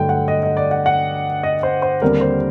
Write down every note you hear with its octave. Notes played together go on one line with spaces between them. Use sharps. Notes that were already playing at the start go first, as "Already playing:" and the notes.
Already playing: G2 D3 F#3 A3 G5
F#5
D#5
D#5
D5
F#5
F#5
D#5
C5
C5
D#2 D3 G3 C4 A#4
C5